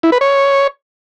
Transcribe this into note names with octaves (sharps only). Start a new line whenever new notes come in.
E4
B4
C#5